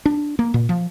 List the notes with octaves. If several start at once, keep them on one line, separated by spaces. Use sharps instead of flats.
D4
A#3
A#2
F3